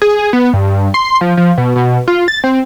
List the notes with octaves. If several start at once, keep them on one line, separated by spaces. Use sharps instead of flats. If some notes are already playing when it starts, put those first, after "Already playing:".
G#4
B3
G2
C6
F3
F3
B2
B2
F4
A6
C4